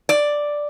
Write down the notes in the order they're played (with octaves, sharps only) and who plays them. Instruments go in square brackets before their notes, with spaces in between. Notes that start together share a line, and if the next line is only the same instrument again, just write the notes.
[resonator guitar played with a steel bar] D5